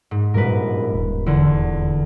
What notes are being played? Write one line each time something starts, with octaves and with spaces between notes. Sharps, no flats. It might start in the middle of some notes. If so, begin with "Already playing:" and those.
G#2
G2 A#2 G3 A#4 B4
D#1
E2 D3